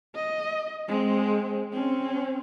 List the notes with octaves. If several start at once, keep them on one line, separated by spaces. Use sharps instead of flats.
D#5
G#3 C4
C4 C#4